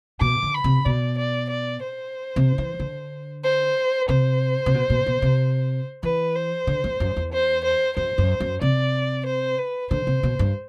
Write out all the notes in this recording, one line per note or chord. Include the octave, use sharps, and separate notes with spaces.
B2 D6
D3
B5
C3
B2 D5
D5
D5
C5
C3
E3
D3
C5
C3 C5
C3
B2
B2
B2
C3
E3 B4
C5
D3
F#2
F#2
E2
C5
C5
F#2 C5
F#2
F#2
C3 D5
C5
B4
D3 C5
C3
B2
G2